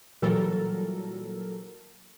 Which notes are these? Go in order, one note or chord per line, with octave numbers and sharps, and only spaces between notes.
A#2 E3 F#3 G3 A4 A#4